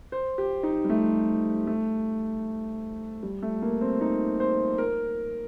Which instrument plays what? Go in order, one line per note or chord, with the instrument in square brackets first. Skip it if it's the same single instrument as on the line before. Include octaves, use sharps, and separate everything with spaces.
[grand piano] C5
G4
D#4
G3
A3
A3
G3
A3
A#3
C4
D#4
C5
A#4